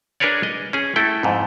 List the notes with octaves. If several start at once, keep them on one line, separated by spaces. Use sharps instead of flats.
D4 G#4 A#4 B4 C#5 D5
D#5
C#4 G#4
A3 E4 A4 G5
F2 G#2